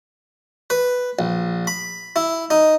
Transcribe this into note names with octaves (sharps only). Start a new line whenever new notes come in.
B4
A#1
B5
E4
D#4